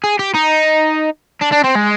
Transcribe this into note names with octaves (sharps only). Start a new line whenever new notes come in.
G#4
G4
D#4
D4
D4
C4
G#3